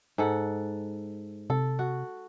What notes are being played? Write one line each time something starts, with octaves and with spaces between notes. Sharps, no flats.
G#2 A4 F#5
C3 A4
F#4